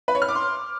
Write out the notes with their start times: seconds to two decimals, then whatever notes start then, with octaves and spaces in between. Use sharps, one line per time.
0.08 B4
0.15 C#5
0.22 F6
0.28 D6
0.35 C6